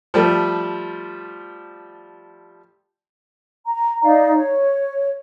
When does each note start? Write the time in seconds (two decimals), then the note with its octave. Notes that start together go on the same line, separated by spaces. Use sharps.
0.14 F3 G3 A3
3.66 A#5
4.02 D#4 D5 F5
4.34 C#5